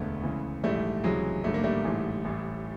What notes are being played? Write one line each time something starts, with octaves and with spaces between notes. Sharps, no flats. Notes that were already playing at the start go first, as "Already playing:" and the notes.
Already playing: E1 D2 D3 A3 B3
C#2 C#3 E3
A#1 G#2 E3 G3 A3
C#2 C3 E3 F#3 G#3
G#1 G2 D3 A3
A#3
G3 A3
A1 G#2 E3
A1 A2 E3